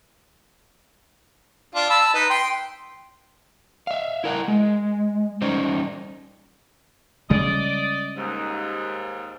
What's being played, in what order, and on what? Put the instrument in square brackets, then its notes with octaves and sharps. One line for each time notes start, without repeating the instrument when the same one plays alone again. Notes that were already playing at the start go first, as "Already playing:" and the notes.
[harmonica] D4 F4
A5 B5 E6
D#4 B4
G5 C6
[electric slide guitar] E5 F5
E4 A#4 F#5
G#3
G3 C#4 D#4 C5
[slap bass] C#3 G3 G#3 [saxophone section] D5 D#5
[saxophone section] D#2 G#2